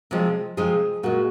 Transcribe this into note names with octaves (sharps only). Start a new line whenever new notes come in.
C3 F3 G#3
C3 F3 G#3 G#4
A#2 G#3 F#4